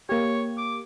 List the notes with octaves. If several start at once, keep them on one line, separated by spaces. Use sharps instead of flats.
A#3 G4 C#5
D6